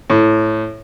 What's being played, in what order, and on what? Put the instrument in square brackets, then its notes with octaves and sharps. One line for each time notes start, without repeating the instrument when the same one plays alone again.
[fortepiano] A2